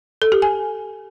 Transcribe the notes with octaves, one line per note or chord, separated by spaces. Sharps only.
A4
G4
G#5